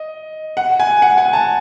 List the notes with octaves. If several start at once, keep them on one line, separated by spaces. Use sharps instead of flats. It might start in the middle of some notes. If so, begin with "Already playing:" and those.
Already playing: D#5
F#5
G#5
F#5
G#5
A5